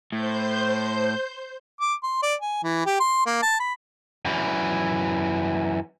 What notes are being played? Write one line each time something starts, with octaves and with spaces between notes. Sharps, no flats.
A2 C5 G6
D6
C6
D5
G#5
E3
G4
C6
A#3
A5
B5
F#2 E3